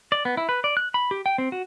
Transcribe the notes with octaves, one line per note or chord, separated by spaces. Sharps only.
D5
B3
E4
B4
D5
F#6
B5
G4
G5
C4
F#4